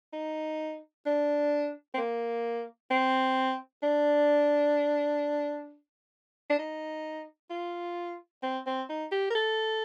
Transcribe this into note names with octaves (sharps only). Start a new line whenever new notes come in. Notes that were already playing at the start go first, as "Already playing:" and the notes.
D#4
D4
C4
A#3
C4
D4
D4
D#4
F4
C4
C4
D#4
G4
A#4
A4